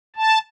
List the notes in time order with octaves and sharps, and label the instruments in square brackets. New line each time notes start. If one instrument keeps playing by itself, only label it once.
[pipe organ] A5